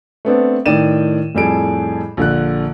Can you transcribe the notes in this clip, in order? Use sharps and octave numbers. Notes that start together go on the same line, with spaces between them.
A3 B3 C4 D4
A2 D#3 D5 G5 D#7 E7
F2 A2 G3 G#4 A4 D7
A#1 D3 F#6